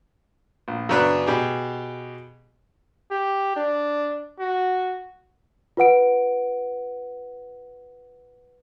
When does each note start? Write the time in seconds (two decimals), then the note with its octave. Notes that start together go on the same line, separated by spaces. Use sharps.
0.68 A#1
0.89 F#2 C#3 B3 D4 B4 F#6
1.27 B2 G4 G#4
3.11 G4
3.56 D4
4.39 F#4
5.77 F4 B4 F#5 D7